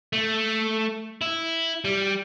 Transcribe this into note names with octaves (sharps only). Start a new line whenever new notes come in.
A3
E4
G3